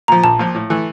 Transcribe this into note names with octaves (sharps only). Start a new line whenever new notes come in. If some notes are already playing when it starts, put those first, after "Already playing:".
A#2 F3 A#5
A#1 A5
A#2 F3
A2
E3 A3